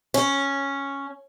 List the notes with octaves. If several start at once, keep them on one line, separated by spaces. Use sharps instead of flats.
C#4